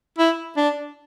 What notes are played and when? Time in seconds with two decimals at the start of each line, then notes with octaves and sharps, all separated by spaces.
0.19 E4
0.57 D4